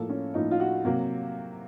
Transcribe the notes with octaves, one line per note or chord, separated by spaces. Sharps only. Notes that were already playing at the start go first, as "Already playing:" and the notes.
Already playing: A2 F3 A#3 A4
C#4
A2 F3 A#3 D#4
F4
F#4
C3 F#3 A#3